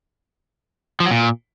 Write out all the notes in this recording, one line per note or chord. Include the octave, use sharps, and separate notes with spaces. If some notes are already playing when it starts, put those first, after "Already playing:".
F3
F#3
A#2